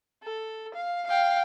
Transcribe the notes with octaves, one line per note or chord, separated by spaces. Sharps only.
A4
F5
F5 G5